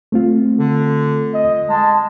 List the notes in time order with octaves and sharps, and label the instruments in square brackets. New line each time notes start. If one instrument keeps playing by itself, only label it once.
[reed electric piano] A3 C4 F4
[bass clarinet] D3
[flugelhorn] D#5
[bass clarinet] G#3 [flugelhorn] A5